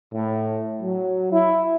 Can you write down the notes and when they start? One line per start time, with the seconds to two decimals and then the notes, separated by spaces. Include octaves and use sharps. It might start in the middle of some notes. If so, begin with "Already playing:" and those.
0.14 A2
0.82 F#3
1.32 E4